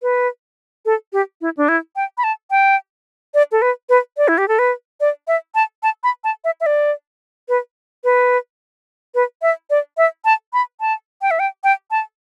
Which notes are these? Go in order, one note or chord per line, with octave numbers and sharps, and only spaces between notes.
B4
A4
G4
E4
D4
E4
G5
B5
A5
G5
D5
A4
B4
B4
D5
E4
G4
A4
B4
D5
E5
A5
A5
B5
A5
E5
E5
D5
B4
B4
B4
E5
D5
E5
A5
B5
A5
G5
E5
G5
G5
A5